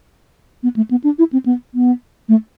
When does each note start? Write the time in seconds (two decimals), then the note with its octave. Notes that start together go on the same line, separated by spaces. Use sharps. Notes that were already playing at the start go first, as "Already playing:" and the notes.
0.63 B3
0.76 A3
0.91 B3
1.04 D4
1.19 E4
1.33 C4
1.46 B3
1.74 B3
2.29 A3